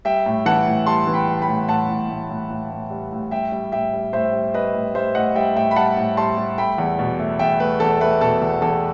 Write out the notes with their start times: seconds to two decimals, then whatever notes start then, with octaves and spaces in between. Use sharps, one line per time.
0.05 G3 E5 G5
0.26 A2
0.46 E3 F#5 A5
0.67 A2
0.86 G3 A5 C6
1.07 E3
1.13 G5 B5
1.27 G3
1.41 G5 B5
1.48 A2
1.68 A2 F#5 A5
1.89 A2
2.09 A2
2.29 A2
2.50 A2
2.70 A2
2.91 G3
3.12 A2
3.31 G3 E5 G5
3.52 G3
3.72 A2 E5 G5
3.93 G3
4.13 A2 C5 E5
4.33 G3
4.54 G3 B4 D#5
4.74 A2
4.95 G3 C5 E5
5.15 A2 D#5 F#5
5.36 G3 E5 G5
5.56 A2 E5 G5
5.71 B5
5.76 G3 F#5 A5
5.97 A2
6.17 G3 A5 C6
6.38 G3
6.58 A3 G5 B5
6.78 E2
6.99 B2
7.19 A3
7.39 E2 E5 G5
7.59 A3 B4
7.80 E2 A4
8.01 A3 B4
8.21 B2 A4
8.42 E2
8.62 E2 A4